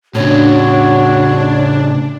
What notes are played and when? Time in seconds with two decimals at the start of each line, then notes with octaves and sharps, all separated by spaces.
0.15 A2 C#3 D4 F#4 C#5